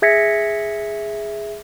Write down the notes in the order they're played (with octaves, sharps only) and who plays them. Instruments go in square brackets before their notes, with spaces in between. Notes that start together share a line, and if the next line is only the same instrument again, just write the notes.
[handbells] G#4 E5 G#6 A#6 B6 C#7